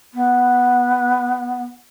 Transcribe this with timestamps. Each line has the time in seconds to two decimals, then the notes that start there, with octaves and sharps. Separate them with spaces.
0.14 B3